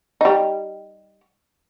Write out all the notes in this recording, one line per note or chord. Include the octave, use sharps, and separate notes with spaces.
G3 D#4